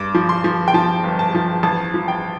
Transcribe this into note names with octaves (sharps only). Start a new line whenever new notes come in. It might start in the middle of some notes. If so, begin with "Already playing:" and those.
Already playing: G2 D6
F3
C6
F3
G5
F3 A5
G1
A5
F3
A1 A5
F3
G5